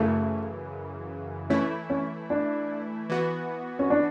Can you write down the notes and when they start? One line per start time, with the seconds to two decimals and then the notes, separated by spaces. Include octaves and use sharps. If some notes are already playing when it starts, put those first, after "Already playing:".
Already playing: F#2 C#3 E3 A3
1.50 E3 A3 C#4 E4
1.90 C#4
2.30 D4
3.10 E3 B3 F#4
3.79 C#4
3.90 D4